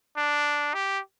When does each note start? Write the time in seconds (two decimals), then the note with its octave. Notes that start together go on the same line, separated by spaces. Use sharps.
0.17 D4
0.74 G4